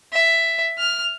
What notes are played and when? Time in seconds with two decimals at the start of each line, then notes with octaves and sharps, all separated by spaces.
0.12 E5
0.78 F6